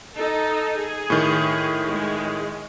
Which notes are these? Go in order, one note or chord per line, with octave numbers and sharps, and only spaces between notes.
D#4 A4
G#4
A2 D#3
G#3